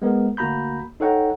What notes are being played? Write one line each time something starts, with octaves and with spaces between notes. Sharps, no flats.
G#3 B3 A#4
D2 A#3 F#4 A#5 B5 G6
D#4 A4 C#5 F#5 G5 A#5